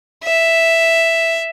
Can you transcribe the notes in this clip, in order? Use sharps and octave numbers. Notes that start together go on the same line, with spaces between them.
E5